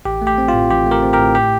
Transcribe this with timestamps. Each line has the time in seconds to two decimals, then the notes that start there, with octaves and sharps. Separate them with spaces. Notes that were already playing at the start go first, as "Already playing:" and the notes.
0.05 A1 G4
0.22 A3
0.27 G4
0.38 C4
0.48 F4
0.54 A2
0.70 A1 G4
0.86 A3
0.91 G4 A#4
1.03 C4
1.13 G4 A#4
1.19 A2
1.35 G4